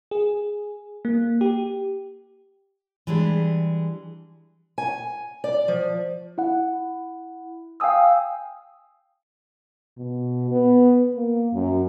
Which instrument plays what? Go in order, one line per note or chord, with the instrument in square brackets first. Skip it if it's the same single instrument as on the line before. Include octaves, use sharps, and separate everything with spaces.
[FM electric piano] G#4
A#3
G4
[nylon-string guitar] E3 G3 G#3 D4
[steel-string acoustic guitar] G#5
D5
F3
[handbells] E4 F#5
F5 G5 G#5 D#6 E6
[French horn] B2
B3
A#3
F#2